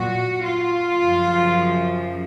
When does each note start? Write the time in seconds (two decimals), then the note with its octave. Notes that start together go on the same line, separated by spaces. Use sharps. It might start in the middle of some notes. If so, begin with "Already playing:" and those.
Already playing: A#2 F#3 F#4
0.44 F4
0.97 F#2 C#3 F3